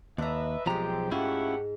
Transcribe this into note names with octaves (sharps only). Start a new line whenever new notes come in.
D#2 D4 B4 D#5 E5 A#5
B1 F3 G#3 C4 G4 G#4 A#5
G#2 A3 C#4 E4 F4 G4 F#5